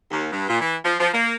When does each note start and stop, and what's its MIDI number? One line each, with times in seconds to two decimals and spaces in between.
0.11 0.28 39
0.32 0.46 43
0.48 0.60 46
0.61 0.75 52
0.85 0.95 53
1.00 1.09 53
1.13 1.35 58